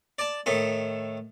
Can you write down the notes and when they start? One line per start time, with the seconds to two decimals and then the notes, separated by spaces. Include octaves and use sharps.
0.19 D5 A5
0.46 A2 D#3 A4